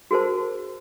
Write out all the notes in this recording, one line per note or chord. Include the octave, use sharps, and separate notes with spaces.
F#4 G#4 A#4 C5 A5